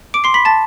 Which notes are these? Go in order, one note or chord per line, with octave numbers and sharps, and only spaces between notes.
D6 D7
C6 C7
B5 B6
A5 A6